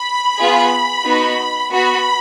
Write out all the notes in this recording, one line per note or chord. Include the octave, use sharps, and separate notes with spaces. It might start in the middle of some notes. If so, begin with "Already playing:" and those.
Already playing: B5
B3 F4 G#4
B3 D#4 F#4
B3 F#4 B5